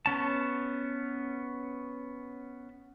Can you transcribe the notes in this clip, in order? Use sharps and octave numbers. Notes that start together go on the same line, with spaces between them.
B3 C#4 A5